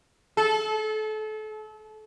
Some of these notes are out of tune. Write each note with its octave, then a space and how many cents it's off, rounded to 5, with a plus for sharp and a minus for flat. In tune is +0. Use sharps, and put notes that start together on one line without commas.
A4 -30